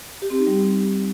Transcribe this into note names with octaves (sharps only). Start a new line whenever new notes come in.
G4
C4
D#4
G3